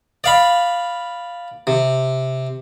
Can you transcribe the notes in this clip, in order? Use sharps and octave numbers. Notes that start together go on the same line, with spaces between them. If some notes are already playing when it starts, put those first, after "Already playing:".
D5 F5 B5
C3